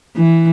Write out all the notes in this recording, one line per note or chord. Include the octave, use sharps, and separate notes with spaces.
E3